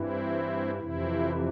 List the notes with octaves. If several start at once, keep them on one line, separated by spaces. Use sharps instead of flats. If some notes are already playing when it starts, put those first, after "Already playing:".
Already playing: G2 E3 C4 E4
F2 C3 E3 C4 E4